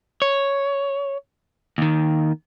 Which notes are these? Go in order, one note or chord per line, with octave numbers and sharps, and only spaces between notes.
C#5
D#2 D#3